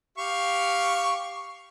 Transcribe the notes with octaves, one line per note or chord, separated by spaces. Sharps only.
G4 F5 C#6